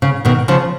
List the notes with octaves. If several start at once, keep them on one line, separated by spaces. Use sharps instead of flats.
C#3
B2 D#3
C#3 F3